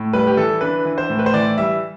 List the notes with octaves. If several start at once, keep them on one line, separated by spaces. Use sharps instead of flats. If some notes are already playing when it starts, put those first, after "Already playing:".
Already playing: A2
G3 B4
G4
E3 A4
D4 B4
E3
C5
A2
B4
C5
E3 D5
G3 E5